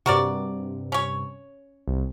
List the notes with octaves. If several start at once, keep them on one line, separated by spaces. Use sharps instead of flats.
G2 C3 F#4 A#4 D5
C#4 C#5
C2